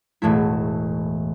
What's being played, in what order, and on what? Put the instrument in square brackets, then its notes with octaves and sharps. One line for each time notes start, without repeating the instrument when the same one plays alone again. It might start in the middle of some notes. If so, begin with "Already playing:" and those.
[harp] E1 A2 A3 E4